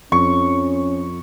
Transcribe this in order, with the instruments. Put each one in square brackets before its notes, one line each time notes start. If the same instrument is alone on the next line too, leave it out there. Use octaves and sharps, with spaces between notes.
[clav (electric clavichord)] F2 [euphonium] C#4 [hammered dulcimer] C#6